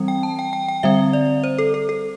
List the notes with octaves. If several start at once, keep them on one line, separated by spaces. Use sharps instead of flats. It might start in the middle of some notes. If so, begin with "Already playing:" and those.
Already playing: E3 G3 C4
G5
A5
G5
G5
G5
D3 G3 C4 E5
D5
C5
A4
A4
A4